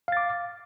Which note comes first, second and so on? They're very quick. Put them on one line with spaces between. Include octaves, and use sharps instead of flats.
F5 A6 D6